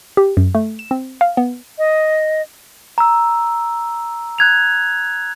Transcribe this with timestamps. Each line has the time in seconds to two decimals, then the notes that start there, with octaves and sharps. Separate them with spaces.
0.17 G4
0.37 F#2
0.55 A3
0.79 E7
0.91 C4
1.21 F5
1.37 B3
1.78 D#5
2.98 A#5 E6
4.38 F#6 G#6 F7